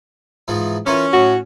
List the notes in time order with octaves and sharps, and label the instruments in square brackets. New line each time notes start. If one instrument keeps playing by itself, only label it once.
[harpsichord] G#2 E3 F3
[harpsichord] E3 F4 A#4 [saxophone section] C#4
[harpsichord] A2 [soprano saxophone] F#4